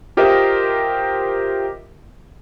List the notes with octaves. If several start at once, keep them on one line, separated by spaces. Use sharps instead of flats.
F4 G4 A#4 C5 D#5 E5